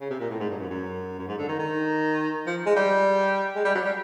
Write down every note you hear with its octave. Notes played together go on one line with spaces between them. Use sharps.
C#3
C3
A#2
A2
G#2
G2
F#2
F#2
F#2
G#2
D3
D#3
D#3
F3
G#3
G3
G#3
G3
F#3
G3